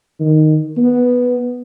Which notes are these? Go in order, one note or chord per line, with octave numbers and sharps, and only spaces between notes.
D#3
B3